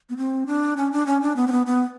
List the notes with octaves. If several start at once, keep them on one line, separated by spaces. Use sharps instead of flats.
B3
C4
D4
C#4
D4
C#4
D4
B3
C4
B3
B3